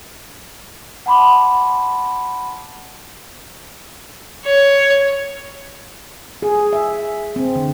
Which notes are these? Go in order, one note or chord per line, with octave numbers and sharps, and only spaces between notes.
F#5 A5 B5 C6 D6
C#5
G#4
E5
C4
D3